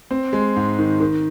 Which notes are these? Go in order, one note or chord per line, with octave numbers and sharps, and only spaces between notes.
C4
G#3
G#2
D#3
D#3